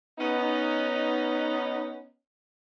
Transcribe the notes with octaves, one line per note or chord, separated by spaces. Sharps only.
B3 C#4 D#4